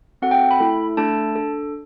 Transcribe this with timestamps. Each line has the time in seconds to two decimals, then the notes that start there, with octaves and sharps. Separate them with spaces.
0.22 C4 F#4 A4 F#5
0.31 G5
0.51 B5
0.60 A3 E4 A4
0.97 A3 D4 A4 A5
1.36 D4 A4